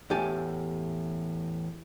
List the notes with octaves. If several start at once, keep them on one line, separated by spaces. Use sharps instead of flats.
E2 A2 G4 G#5 A5